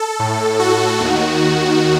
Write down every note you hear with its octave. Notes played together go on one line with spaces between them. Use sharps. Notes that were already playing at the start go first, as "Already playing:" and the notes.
Already playing: A4
A2
F#4
D#2 D#3